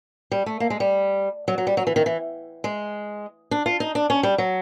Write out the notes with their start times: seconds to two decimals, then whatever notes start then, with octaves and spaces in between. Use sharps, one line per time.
0.31 G3
0.46 A3
0.60 A#3
0.70 G#3
0.80 G3
1.48 F#3
1.58 F#3
1.67 G3
1.77 F#3
1.87 E3
1.96 D#3
2.06 E3
2.64 G#3
3.51 D4
3.66 F4
3.80 D#4
3.95 D4
4.10 C#4
4.23 G3
4.38 F#3